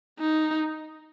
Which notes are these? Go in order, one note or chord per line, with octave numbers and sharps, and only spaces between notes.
D#4